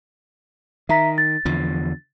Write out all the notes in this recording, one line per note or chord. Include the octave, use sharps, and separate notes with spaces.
D#3 E5 A#5 B6
A6
E2 D3 F3